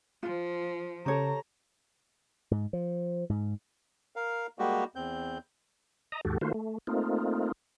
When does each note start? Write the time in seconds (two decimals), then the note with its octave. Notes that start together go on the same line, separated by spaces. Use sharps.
0.23 F3 F4
1.06 C#3 G4 A4 C#5 A#5
2.51 G#2
2.73 F3
3.30 G#2
4.16 A#4 F5
4.59 G3 G#3 A#3 F#4 G4
4.95 E2 C4 G6
6.12 D#5 A#5
6.25 D#2 G#2 F#4 G4 A4
6.41 D#3 A3 A#3 F4 F#4 C5
6.54 A3
6.87 A3 A#3 C4 D#4 F4